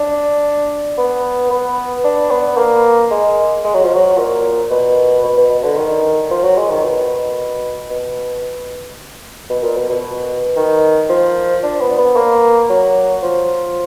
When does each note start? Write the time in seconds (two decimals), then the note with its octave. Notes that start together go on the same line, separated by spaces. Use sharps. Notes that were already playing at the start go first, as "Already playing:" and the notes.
Already playing: D4
0.98 B3
1.51 B3
2.04 D4
2.31 B3
2.57 A#3
3.11 G#3
3.64 G#3
3.74 F#3
3.84 F3
3.94 F#3
4.17 A#2
4.71 B2
5.24 B2
5.37 B2
5.50 B2
5.64 D3
5.77 D#3
6.30 F3
6.43 F#3
6.57 G#3
6.70 D#3
6.83 B2
7.90 B2
9.50 B2
9.63 A#2
9.76 B2
9.90 B2
10.56 D#3
11.10 F3
11.63 D4
11.81 B3
11.98 B3
12.16 A#3
12.70 F#3
13.23 F3